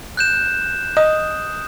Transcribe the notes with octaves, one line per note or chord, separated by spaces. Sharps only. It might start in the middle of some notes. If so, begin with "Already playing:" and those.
F#6 G6 E7
D#5 D#6